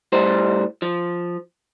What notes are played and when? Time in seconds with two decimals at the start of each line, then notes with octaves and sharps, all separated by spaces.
0.12 A2 G3 C5
0.82 F3